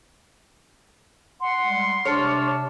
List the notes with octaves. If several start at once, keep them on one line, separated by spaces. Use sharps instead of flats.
F#5 C6
G3 G#3
C3 D4 C#5 A5 F6